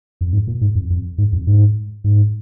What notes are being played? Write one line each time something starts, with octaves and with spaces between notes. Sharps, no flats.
F2
G#2
A#2
G#2
F2
F2
G#2
F2
G#2
G#2